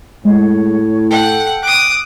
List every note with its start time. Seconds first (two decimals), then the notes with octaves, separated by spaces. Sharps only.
0.25 A2 G#3 C#5
1.10 A4 F#5 G5
1.63 D6 D#6 F#6